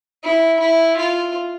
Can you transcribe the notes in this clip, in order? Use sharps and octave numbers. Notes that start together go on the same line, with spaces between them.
E4
E4
F4